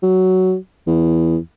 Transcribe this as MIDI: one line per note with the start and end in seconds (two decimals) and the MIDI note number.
0.03 0.55 54
0.87 1.37 40